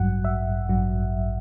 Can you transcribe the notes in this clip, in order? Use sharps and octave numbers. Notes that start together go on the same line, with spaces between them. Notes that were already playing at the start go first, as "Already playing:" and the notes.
Already playing: A1 G2 F#3 F#5
E5
A1 G2 F#3